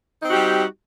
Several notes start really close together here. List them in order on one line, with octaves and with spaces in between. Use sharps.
D#4 C4 F#4 G4 G3